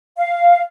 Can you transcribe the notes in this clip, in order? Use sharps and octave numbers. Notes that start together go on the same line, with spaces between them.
F5